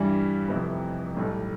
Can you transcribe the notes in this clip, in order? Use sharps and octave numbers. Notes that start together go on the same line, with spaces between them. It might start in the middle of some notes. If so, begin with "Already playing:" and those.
Already playing: G2 E3 G3
F1 F2 C3 E3 B3
B1 A2 G3